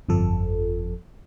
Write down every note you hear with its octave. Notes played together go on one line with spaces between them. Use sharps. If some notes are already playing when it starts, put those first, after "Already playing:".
G1 F2 F3 A4